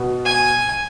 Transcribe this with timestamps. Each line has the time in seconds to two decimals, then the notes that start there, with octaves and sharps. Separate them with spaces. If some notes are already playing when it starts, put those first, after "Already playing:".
Already playing: B2 B3
0.25 G#5